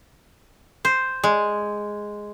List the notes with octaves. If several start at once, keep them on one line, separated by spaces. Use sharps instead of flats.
C5
G#3